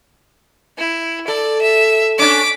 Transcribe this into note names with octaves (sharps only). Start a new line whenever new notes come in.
E4
A4 D5
E5
C#4 D4 D6 B6